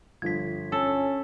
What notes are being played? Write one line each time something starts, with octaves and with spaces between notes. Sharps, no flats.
G1 F3 G#6 B6
C#4 A4